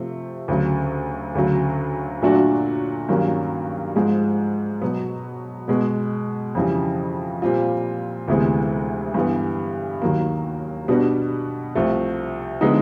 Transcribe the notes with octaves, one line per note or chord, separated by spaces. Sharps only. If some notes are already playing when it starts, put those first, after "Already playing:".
Already playing: C3 F3 A3 C4
D2 C#3 F#3
D2 C#3 F#3
A#2 F#3 A3 D4 F#4
G2 D#3 F#3 A#3 C#4
G#2 F3 G#3
B2 F#3 B3
B2 G#3 B3
F2 C#3 E3 G3
A#2 G3 C4 F4
D2 C3 E3 G#3 B3
G2 E3 G3 B3
D#2 D#3 F#3 A#3
B2 G3 B3 D4 F#4
C2 C3 F3 A3 C4
D3 F3 G#3 B3 D#4